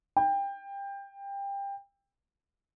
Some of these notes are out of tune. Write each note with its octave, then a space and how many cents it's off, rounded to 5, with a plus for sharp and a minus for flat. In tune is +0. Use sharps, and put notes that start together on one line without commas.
G5 +20